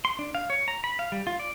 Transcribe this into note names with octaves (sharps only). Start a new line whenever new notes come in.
C6
D4
F5
C#5
A#5
B5
F5
G3
F4
D5